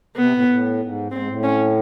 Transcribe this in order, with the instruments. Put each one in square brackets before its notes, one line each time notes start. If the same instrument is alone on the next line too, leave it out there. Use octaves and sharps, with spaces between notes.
[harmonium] C3 [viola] B3
[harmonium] A2
A2
G#2
[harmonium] G#2 [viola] C4
[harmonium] A2
[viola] C#4